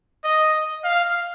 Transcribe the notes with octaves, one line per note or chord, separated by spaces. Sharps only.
D#5
F5